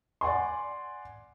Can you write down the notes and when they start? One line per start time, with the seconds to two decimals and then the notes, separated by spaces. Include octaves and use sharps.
0.21 D5 F#5 G#5 C6